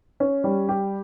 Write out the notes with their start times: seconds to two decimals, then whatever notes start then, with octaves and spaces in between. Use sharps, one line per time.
0.20 C#4
0.44 G3
0.69 G4